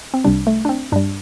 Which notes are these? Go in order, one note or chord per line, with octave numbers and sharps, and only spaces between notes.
C4
C2 C3 G3 D4
A3
D4
C4
G2 G3 D4